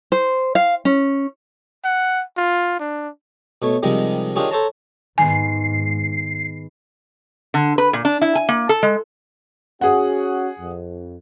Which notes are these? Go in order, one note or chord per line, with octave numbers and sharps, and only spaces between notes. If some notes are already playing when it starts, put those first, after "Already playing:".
C5
F5
C#4
F#5
F4
D4
B2 A3 C#5
C3 D#3 F3 G3 G#3
D#3 D4 F4 G4 G#4 C#5
A4 C5 C#5 A5 A#5
G#2 D#3 G#3 B3 G#5 C7
D3
B4
A#2
D4
E4
G#5
A#3
A4
G#3
C#4 F#4 G#4 F#5
F2